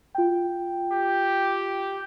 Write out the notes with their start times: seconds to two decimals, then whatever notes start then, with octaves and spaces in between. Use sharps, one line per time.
0.15 F4 G5
0.92 G4